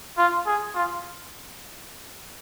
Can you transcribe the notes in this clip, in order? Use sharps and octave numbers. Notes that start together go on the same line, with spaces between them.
F4
G#4
F4